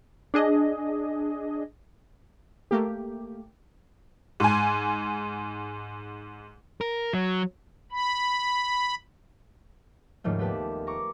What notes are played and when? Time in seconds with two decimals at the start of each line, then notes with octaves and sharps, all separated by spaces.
0.34 D4 G#4 D#5
2.71 A3 A#3 G4
4.40 G#2 G#5
6.81 A#4
7.13 F#3
7.91 B5
10.24 D#2 G#2 C#3 F3 A3
10.39 A3 B3 G4 B4 A5
10.87 A#5 C#6 D6